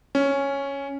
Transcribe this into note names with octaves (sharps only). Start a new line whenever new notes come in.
C#4